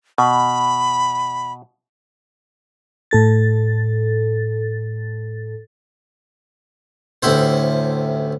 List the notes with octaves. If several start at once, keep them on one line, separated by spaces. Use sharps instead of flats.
B2 B5
A2 A4 A6
A1 D2 E4 C5